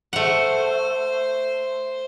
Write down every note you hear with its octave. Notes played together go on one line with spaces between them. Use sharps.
A3 C5 F#5